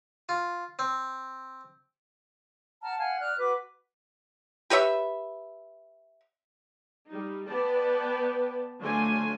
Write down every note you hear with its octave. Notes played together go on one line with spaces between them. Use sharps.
F4
C4
F#5 A5 A#5 F6
F5 F#5 G#5 F6
D5 F6 F#6
F#4 B4 D6
G4 B4 C#5 E5
G3 D#4
B3 B4 D5 G5 A5
D3 F#3 A3 F4 C5 G#5